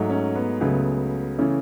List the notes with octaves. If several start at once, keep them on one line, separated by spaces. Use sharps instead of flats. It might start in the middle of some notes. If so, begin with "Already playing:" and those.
Already playing: G#2 F#3 A3
C#4
B3
C#2 C#3 F#3 A3 B3
C#3 E3 A3 C#4